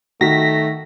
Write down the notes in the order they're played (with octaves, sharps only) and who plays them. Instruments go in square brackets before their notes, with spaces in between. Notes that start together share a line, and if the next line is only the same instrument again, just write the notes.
[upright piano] D#3 [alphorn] A3 [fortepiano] F#4 [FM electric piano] A#6 B6